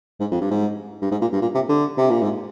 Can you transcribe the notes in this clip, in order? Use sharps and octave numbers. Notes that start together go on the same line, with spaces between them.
G#2
F2
G2
G#2
G2
G#2
A#2
G2
A#2
C3
D3
C3
A#2
G#2